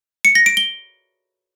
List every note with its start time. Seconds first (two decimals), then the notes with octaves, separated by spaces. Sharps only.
0.25 C#7
0.35 A#6
0.46 D7
0.57 G7